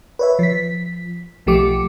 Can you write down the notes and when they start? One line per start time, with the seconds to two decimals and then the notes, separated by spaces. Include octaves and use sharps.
0.19 B4 C#5 E5
0.39 F3 B6
1.46 B1 F3 A3 G4 D6 C#7